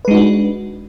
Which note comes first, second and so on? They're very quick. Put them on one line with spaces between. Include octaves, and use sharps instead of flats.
B4 G#3 D#4 F#4 D4